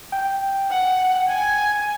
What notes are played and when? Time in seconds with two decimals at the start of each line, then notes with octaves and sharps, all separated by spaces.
0.12 G5
0.70 F#5
1.28 G#5